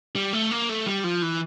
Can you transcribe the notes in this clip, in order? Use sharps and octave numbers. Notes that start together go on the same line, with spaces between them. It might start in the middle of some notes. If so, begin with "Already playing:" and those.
G3
A3
A#3
A3
G3
F3
E3